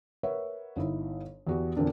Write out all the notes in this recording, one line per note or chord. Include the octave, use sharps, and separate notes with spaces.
A#4 B4 C#5 E5 F#5
G1 D#4 E4
E2 F#4 G4
E2 A#2 D3 A#3 C4 D4